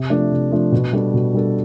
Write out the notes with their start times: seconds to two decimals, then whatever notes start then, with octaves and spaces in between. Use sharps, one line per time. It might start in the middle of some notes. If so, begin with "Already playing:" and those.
Already playing: C3
0.10 F3 A3 D4
0.32 C3
0.51 F3 A3 D4
0.72 B2
0.93 G3 D4 A4
1.14 B2
1.34 G3 D4 A4